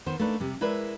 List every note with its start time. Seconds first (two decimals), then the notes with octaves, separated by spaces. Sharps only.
0.06 D#3 B3 C5
0.20 A3 A#3 D4 D#4 B4
0.40 C3 G3
0.61 G#3 E4 A#4 B4 D5 E5